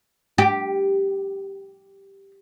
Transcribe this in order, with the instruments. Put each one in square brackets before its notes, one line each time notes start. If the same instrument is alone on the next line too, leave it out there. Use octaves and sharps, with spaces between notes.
[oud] G4